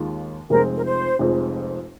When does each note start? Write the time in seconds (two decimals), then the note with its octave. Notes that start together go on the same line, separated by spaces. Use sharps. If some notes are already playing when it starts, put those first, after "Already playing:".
Already playing: D#2 D#3 G#3 F4
0.50 F1 F2 F3 G#3 C4 A#4
0.77 A#4
0.85 C5
1.19 F1 F2 F3 G#3 C4